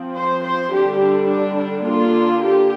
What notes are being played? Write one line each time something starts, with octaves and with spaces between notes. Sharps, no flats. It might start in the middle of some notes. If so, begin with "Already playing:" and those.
Already playing: F3 C4
C5
C5
D3 G3 D4 G4
D4
D4
D4
D3 A#3 D4 F4
G4